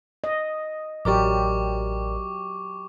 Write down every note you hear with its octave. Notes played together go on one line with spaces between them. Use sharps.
D#5
A1 F#3 G4 A#4 D5 C#6 D6